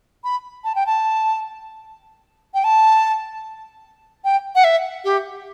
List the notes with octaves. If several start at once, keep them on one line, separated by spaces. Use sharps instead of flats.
B5
A5
G5
A5
G5
A5
G5
F#5
E5
G4